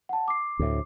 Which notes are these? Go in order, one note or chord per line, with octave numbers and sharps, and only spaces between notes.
F#5 A5
D6 C7
D2 A2